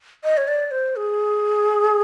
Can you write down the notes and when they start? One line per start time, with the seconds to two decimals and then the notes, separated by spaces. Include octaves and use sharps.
0.24 D#5
0.37 C#5
0.48 D5
0.71 C5
0.96 G#4